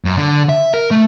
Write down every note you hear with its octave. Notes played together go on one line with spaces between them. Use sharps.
F#2
D3
E5
A#4
A3